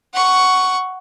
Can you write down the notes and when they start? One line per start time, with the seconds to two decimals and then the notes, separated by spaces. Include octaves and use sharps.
0.14 F#5 C#6